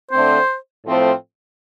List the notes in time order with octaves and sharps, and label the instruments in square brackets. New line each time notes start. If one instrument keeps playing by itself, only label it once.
[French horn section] D3 A3 C4 [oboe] C5
[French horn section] A2 F3 A3 C4